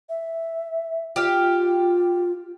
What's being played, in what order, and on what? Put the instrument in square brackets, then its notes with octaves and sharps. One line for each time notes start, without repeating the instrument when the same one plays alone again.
[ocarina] E5
[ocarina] F4 [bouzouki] G4 F5